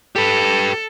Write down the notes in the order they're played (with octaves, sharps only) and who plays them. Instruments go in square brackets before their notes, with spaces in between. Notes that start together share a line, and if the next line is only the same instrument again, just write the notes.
[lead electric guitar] G4 B4 [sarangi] A4